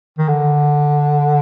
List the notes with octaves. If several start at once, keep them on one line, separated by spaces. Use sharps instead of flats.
D#3
D3